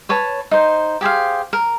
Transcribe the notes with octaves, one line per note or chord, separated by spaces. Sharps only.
B4 C#5 A5 C#6
D#4 C5
G4 G#4 C5 F5
A#4